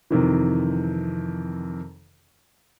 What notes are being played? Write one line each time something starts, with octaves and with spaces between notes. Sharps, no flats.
F2 C3 D#3 E3